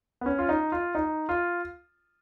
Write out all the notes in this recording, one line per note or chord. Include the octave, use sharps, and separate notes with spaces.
B3
C#4
F4
D#4
F4
D#4
F4